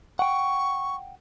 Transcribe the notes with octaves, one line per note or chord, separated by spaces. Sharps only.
F#5 G5 C#6